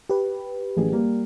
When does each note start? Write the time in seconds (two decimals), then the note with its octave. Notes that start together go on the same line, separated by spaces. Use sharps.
0.10 G4 B4
0.77 A1 G#4
0.92 G3 A#3